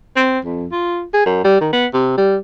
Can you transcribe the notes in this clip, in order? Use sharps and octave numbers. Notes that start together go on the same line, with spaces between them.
C4
F2
F4
G#4
F#2
G3
D#3
B3
C3
G3